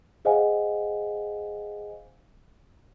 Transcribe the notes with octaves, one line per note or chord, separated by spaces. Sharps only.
G#4 C5 D#5 F5 F#5 G#5